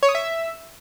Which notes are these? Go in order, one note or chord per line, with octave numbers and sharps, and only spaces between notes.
C#5
D#6
E5